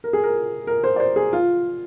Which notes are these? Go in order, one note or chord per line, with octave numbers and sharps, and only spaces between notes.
A#4
G#4
A#4
A#4
C5
D5
C5
G#4
F4